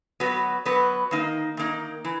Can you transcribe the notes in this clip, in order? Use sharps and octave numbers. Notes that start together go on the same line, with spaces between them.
F#3 B3 F#4 B4
F#3 B3 F#4 B4
D#3 A#3 D#4
D#3 A#3 D#4
E3